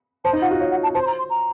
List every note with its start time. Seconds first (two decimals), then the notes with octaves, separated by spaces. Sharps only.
0.25 C5 A5
0.33 D#4
0.42 F4 F#5
0.51 F#4
0.60 C#5 F5
0.71 F#5
0.83 A5
0.94 C5 A5
1.02 C6
1.07 A#5
1.19 C6
1.30 A#5